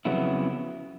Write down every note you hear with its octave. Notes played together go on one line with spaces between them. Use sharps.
F2 C#3 F#3 B3 E4